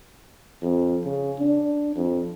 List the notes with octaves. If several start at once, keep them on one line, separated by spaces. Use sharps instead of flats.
F2
C#3
D4
F2